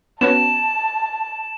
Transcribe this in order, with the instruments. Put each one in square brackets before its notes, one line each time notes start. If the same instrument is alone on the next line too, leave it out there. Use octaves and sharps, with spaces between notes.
[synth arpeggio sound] B3 C#4 F#4 [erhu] A5 [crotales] E7